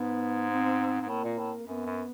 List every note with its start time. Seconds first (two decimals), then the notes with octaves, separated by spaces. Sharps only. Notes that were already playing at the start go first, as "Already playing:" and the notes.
Already playing: G#2 B3
0.50 C4
1.01 G#2
1.08 A2 A#3
1.24 A#2
1.38 A2
1.67 F#2 B3
1.86 F#2